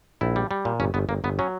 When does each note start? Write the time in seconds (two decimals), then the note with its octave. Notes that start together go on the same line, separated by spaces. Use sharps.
0.21 A#1 E4
0.36 G3
0.51 G3
0.65 A#2
0.80 G1 C#4
0.94 G1 B3
1.09 G1 A#3
1.24 G1 B3
1.39 F#3 C#4